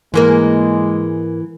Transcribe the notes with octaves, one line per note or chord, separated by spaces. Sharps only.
G#2 E3 G#3 A#3 A#4